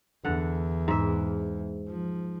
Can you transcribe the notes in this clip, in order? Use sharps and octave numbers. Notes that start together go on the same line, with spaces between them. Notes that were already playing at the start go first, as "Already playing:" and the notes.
E2 D3 F#5
G#2 E5
F3